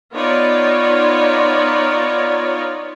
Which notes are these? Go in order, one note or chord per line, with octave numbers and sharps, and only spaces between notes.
B3 D#4 F4 C#5 D5